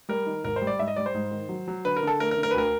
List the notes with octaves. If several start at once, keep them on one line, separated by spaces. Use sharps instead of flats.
G3 A#4
D#3
G#1 A#4
C5
G3
D5
G#2 E5
D#5
G3 D5
C5
G#2
D#3
F#3
F#3
D3 B4
A#4
D3 A4
A3 A#4
A#4
D3
A#4
B4
D2 A#4